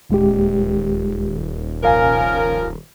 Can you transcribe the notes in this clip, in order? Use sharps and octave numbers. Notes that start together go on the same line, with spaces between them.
D#1 D2 G#3 G4
C2 F3 C#4 A#4 F5 G#5